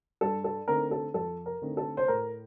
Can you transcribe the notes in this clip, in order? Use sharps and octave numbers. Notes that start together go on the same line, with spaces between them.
G2 A4
A4
D3 A3 C4 D#4 A#4
A4
F2 A4
A#4
D3 A3 C4 D#4
A4
C5
A2 A#4